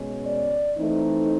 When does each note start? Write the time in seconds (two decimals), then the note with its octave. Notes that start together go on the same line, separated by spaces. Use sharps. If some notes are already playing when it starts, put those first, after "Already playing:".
Already playing: B2 G#3 C#4
0.27 D5
0.77 E3 A3 C4 D#4